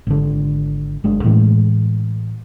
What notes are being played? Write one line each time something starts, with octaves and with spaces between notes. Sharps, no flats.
G#1 D3
G1 G#3 D4
A2 E3 G#3